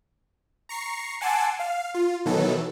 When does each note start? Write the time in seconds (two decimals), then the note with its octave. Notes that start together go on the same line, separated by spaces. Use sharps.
0.69 A#5 C#6 C7
1.21 F#5 G#5 A5 C6 D6 E6
1.59 F5
1.94 F4
2.26 B2 D#3 E3 F#3 A4